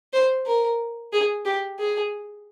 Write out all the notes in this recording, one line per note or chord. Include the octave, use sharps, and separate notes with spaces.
C5
A#4
G#4
G4
G#4